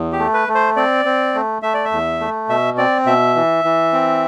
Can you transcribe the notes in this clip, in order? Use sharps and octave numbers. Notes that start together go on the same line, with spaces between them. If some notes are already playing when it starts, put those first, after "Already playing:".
Already playing: E2
G4
A3
B4
A3
C5
C4 D5
C4
A3
A3 E5
D5
E5
E2
A3
B2 E5
C4 D5
B2 E5
E3
E3
C4